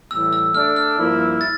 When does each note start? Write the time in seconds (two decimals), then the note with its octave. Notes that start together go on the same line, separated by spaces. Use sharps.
0.11 A2 E3 G3 E6
0.33 E6
0.54 A3 D4 A4 D5 F6
0.76 F6
0.98 G2 F3 A#3 E4
1.41 A6